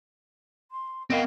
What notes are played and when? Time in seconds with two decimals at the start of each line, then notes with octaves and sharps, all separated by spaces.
0.71 C6
1.10 B3 C4 A#4 D#5 F5 G5